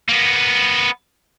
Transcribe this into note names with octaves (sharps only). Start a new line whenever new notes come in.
A#3 B3